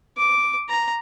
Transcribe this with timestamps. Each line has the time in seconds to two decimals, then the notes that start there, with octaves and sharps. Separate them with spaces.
0.17 D6
0.69 A#5